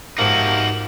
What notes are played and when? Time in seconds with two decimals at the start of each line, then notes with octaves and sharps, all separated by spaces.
0.18 G#2 C3 F3 A#3 D#4 F#4 F#7